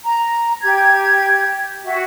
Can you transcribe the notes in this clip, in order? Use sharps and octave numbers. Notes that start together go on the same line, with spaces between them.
A#5
G4 G#6
F#4 E5